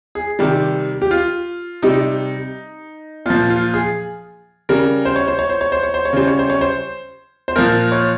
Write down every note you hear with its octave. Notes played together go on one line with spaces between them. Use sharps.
G#4
C3 D#3 G3 G4
G4
F4
C3 G3 D#4
A#2 F3 F4
F4
G#4
C#3 G3 A#4
C5
C#5
C5
C#5
C5
C#5
C5
C#5
C5
C#5
C#3 G3 C5
C#5
C5
C#5
C5
C5
A#2 F3 A#4
C#5